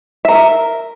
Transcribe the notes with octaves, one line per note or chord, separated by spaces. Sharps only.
A#4 E5